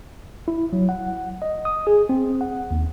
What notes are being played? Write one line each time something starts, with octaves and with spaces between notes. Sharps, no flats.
E4
F#3
F#5
D#5
D#6
G#4
C4
F#5
D#2